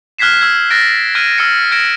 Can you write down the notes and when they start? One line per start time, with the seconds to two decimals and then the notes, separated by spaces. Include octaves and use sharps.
0.19 F6 F#6 G#6 B6 C7 E7
0.41 E6 G#6
0.70 F#6 A6 A#6 D7
1.15 F6 F#6 G#6 D7 D#7
1.38 E6 F6 A#6 C7 C#7
1.72 G#6 A#6 D7 E7